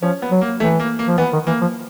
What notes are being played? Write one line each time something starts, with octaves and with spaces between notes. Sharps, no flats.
F3 C#4
B3
F#3
A#3
E3 A3
A#3
A#3
F3
E3 B3
D#3
E3 A#3
F3